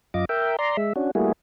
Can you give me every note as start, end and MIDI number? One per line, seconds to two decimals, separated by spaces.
0.14 0.25 42
0.14 0.25 65
0.14 0.25 75
0.14 0.25 86
0.29 0.56 70
0.29 0.56 76
0.29 0.56 79
0.59 0.77 74
0.59 0.77 82
0.59 0.77 84
0.77 0.93 56
0.77 0.93 76
0.96 1.11 61
0.96 1.11 62
0.96 1.11 66
1.15 1.32 55
1.15 1.32 57
1.15 1.32 58
1.15 1.32 64
1.15 1.32 66
1.15 1.32 68